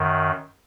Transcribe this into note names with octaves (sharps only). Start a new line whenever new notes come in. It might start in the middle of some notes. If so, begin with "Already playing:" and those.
Already playing: F#2 D#3